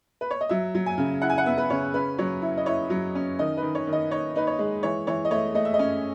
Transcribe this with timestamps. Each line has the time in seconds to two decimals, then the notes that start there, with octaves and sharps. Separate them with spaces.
0.21 B4
0.31 C#5
0.41 D#5
0.49 F#3 E5
0.75 F#3
0.86 G#5
0.98 C#3
1.22 E4 F#5
1.30 G#5
1.38 F#5
1.46 B3 E5
1.58 B4
1.70 C#3 C#5
1.94 C#4 B4
2.19 F#3 C#5
2.42 E4
2.58 D#5
2.66 E4 C#5
2.90 F#3
3.15 C#4
3.39 D#3 D#5
3.57 D#3 B4
3.75 C#5
3.87 D#3
3.93 D#5
4.10 D#4 C#5
4.36 D#4 B4
4.47 C#5
4.59 G#3
4.83 E3 C#5
5.07 E3 C#5
5.25 D#5
5.31 A3 C#5
5.55 A3 D#5
5.65 E5
5.74 D#5
5.79 C#4